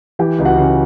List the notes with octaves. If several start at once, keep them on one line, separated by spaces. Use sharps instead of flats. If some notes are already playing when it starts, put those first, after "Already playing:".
E3 G4 G5
C#2
F#4 F#5
C#3